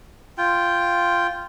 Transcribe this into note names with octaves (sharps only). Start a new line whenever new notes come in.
F4 G5